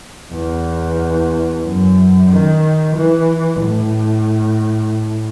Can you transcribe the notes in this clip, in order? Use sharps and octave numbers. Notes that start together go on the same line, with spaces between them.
E2
F#2
D#3
E3
A2